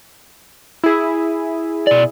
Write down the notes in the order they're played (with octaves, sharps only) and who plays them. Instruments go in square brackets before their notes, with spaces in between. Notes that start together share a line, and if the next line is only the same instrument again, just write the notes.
[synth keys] E4 G#4
[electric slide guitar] B2 D5